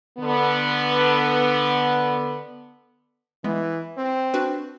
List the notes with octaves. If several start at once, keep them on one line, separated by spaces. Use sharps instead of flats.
D3 B3
E3 G#3 B3
C4
D4 F#4 B4